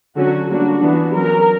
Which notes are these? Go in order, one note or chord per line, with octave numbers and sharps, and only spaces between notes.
D3 F#3 C#4 F#4
G3 A#3 D4 F#4
E3 B3 D4
F#3 C#4 A#4